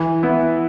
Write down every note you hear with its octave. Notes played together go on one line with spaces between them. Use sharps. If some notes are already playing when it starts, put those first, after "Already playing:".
Already playing: E3
B3 E4